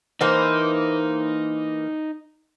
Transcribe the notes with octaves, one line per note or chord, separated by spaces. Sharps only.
E3 A#3 D#4 C5